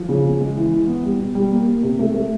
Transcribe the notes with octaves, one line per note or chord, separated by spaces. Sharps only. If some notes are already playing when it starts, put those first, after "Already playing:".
Already playing: F3
C#3
C#3
G#3
E3
E3
B3
G3
B2
G3
A#3
A#3
C3
A3
A3